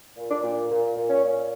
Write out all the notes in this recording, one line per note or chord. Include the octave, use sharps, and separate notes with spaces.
A#2
D4
A#2
A#2
A#2
C#4
A#2